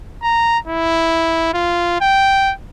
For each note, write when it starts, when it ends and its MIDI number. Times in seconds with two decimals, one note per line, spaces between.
0.23 0.58 82
0.67 1.53 64
1.54 2.01 65
2.01 2.53 79